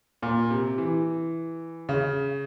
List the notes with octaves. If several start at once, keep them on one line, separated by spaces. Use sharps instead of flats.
A#2
C3
E3
C#3